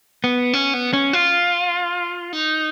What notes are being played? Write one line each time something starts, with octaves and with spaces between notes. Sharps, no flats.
B3
C#4
B3
C#4
F4
D#4